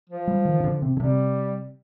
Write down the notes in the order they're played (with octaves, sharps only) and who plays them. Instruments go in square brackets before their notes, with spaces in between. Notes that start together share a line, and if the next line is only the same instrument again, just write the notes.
[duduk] F3
[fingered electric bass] G3
D#3
C3
D3
C3
D3
[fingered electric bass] C3 [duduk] G3